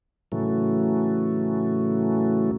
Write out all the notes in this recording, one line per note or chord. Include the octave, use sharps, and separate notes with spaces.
A2 C#3 E3 F#3 A3